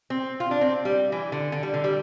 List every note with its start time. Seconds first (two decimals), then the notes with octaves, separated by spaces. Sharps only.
0.10 C4
0.40 F4
0.51 D4
0.61 C4
0.85 G3
1.12 E3
1.32 D3
1.52 D3
1.63 G3
1.74 D3
1.84 G3